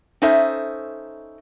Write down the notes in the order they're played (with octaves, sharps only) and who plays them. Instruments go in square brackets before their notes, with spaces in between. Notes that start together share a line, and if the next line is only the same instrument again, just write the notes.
[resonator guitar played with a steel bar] C#4 D#4 A4 C5 E5